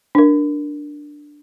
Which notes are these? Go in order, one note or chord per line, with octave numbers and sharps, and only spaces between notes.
D4 A#4